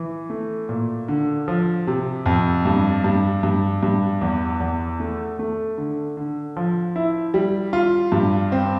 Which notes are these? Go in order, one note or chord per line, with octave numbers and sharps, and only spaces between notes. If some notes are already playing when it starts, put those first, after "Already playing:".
Already playing: E3
A3
A#2
D3
F3
C3
F2
G2
G2
G2
G2
E2
E2
A3
A3
D3
D3
F3
E4
G3
F4
G2
C4